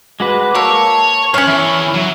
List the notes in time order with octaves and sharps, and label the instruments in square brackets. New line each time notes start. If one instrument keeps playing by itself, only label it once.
[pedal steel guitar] G#3 F#4 B4 [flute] D6
[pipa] A#3 [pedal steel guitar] A#4 E6 [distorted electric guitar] C#5 [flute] A5
[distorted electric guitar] F#2 F#5 [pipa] C#4 C#5 [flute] F6
[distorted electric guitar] E2 E3 [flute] E5
[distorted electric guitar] F#3